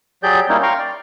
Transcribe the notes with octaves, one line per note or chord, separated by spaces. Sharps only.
F#3 G4 G#4 D5 G6
G3 A#3 C#4 D#4 E4
F5 G5 A#5 C6 C#6
D5